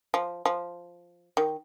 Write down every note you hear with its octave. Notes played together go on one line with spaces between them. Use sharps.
F3
F3
D#3